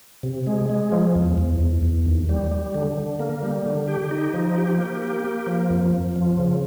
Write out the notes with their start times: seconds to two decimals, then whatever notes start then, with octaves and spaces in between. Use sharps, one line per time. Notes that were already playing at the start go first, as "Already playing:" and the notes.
0.23 C3
0.47 G#3
0.70 G#3
0.92 F3
1.15 E2
1.38 E2
1.60 E2
1.83 E2
2.06 D#2
2.29 G3
2.51 G3
2.74 D3
2.97 D3
3.20 A#3
3.43 G3
3.65 D3
3.88 G4
4.11 D#4
4.34 F3
4.56 G4
4.78 A#3
5.02 G4
5.24 A#3
5.47 F3
5.70 F2
5.93 F2
6.16 F3
6.38 C#3